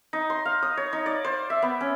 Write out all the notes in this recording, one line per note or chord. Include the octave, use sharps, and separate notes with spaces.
D#4
C6
F5
D#6
C#5
D#4
D5
C5
E5
B3
C#4